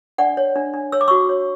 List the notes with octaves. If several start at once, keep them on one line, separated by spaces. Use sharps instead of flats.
D4 D5 F#5
C#5
D4
D4
C#5 E6
D6
F#4 C#6 E6
C#5